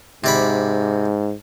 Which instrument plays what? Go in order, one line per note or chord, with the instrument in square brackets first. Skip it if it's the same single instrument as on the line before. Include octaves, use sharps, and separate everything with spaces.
[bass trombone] G#2 [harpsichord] C3 D5 B5